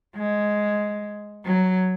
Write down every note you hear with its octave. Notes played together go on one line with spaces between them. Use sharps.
G#3
F#3